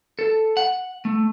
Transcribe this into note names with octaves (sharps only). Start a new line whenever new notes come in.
A4
F#5
A3